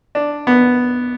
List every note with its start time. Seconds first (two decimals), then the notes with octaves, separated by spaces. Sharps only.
0.15 D4
0.47 B3